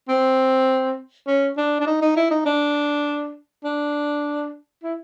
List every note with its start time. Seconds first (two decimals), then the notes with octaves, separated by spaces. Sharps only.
0.09 C4
1.27 C#4
1.58 D4
1.80 D4
1.87 D#4
2.02 D#4
2.16 E4
2.31 D#4
2.46 D4
3.64 D4
4.83 E4